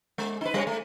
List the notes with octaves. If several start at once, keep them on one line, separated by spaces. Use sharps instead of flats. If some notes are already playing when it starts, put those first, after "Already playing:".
G#3
D#4 B4
G3 B4 C#5
A3